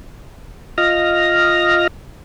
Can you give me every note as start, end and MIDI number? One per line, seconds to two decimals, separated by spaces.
0.78 1.87 65
0.78 1.87 75
0.78 1.87 89
0.78 1.87 94